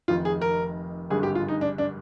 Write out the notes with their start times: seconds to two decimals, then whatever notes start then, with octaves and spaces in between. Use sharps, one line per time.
0.08 F1 F2 D#3 F4
0.25 G#4
0.41 A#4
1.10 G#1 G2 D3 G#3 G#4
1.23 G4
1.35 F4
1.48 D#4
1.61 D4
1.78 D4